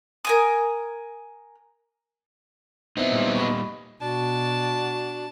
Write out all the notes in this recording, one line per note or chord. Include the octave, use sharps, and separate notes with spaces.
A#4 G#5 D#6
B3 C4 D#4 E4
A#2 G3
D#5 B5 C#6
B2 D4 F#4 A5